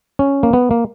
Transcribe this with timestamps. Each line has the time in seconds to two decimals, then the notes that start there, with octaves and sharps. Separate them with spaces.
0.19 C#4
0.43 A#3
0.53 B3
0.71 A#3